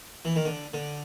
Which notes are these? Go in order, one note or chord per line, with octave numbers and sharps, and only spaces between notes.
E3
D#3
D3
D3